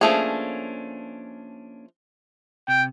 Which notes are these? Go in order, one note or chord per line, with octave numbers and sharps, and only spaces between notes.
F3 A3 A#3 C#4 D4 G#4
C3 G5